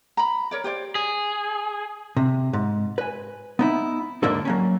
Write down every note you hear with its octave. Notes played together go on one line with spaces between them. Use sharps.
A#5 B5
A#4 C#5 D5
G4 C5 D5
G#4
C3
G#2
B4 G#5
B3 D#4 E4
D#2 G#2 D3 A#3 D4 A4
F#3 A#3 C#4